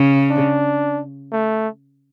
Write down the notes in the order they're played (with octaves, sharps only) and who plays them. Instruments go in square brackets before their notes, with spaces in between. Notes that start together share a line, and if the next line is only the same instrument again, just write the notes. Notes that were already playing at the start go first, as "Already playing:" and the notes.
Already playing: [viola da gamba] C#3
[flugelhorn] D4
A3